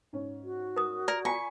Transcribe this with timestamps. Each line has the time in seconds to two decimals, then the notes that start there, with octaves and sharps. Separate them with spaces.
0.13 G#2 C#4
0.44 F#4
0.76 A#4 D#6
1.08 A#4 D5
1.25 F4 G#5 B5 C#6 B6